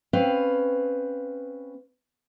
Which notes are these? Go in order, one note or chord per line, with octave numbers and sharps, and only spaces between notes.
C4 C#4 B4 F5